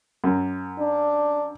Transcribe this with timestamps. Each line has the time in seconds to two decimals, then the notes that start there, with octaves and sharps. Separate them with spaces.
0.24 F#2
0.79 D4